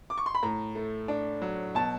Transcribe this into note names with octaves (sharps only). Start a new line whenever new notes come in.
D6
C#6
C6
B5
A2 A#5
A3
D4
F#3
B2 A5